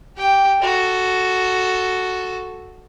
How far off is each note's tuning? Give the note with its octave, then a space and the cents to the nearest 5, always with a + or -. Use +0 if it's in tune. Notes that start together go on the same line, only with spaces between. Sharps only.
G4 -15 G5 +0
F#4 +0 A4 +0